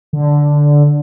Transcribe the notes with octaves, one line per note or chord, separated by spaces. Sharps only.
D3